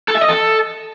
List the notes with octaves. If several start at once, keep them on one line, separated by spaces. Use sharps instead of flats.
A4
E5
D#5
A4